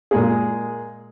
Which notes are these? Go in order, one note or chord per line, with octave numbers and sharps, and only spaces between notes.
A#2 G#3 A#3 G#4